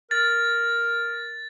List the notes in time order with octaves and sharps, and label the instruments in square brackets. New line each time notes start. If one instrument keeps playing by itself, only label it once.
[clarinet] A#4 [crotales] A6